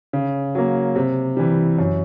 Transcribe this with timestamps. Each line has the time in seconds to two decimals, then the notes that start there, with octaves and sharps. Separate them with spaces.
0.13 C#3
0.55 F#3 A#3
0.96 C3
1.37 E3 G3
1.78 F#2